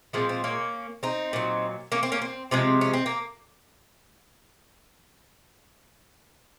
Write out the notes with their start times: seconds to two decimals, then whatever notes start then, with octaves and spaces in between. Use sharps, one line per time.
0.13 A#2 F3 G#3 C4
0.29 C4
0.44 A#3 C#4
1.03 C4 D#4
1.33 A#2 F#3
1.92 A#3 C#4
2.03 C4
2.12 A#3 C#4
2.22 C4
2.51 C3 F3 G#3 C4
2.81 C#4
2.93 C4
3.06 A#3